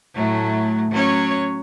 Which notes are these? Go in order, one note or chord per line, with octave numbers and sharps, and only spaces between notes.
A2 F#3 A3
F#3 C#4 C#5